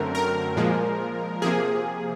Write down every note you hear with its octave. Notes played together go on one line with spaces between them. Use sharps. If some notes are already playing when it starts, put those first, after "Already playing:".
Already playing: F#2 D3 F#3 A3 C4 A#4
A#4
A#2 F3 G#3
C3 F3 A#3 G#4